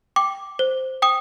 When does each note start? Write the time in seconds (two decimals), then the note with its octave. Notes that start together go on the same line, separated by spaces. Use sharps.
0.16 G5 D6
0.59 C5
1.02 G5 D#6